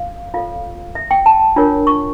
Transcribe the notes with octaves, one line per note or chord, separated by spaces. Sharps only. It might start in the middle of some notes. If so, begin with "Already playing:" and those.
Already playing: F5
F4 A4 C#5 F5
E5
G5
A5
D4 F4 A#4 C#5
C#6